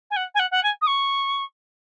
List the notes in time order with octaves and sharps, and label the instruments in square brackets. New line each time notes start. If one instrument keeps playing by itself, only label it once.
[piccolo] G#5
F#5
G#5
F#5
F#5
G#5
D#6
C#6